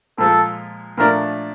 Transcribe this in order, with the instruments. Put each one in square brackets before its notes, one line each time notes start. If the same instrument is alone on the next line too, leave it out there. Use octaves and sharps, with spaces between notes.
[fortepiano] A#2 F3 G#3 [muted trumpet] A4
[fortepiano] A#2 F3 A3 D4 [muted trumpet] A#4